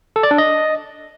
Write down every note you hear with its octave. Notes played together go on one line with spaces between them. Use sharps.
A4
D5
D4
D#5